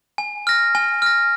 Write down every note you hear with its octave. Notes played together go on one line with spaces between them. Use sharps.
G#5
F6 A#6
G#5
F6 A#6